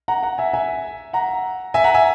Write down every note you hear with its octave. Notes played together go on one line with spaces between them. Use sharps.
F#5 A#5
F#5 A#5
E5 G#5
E5 G#5
F#5 A#5
E5 G#5
F#5 A#5
E5 G#5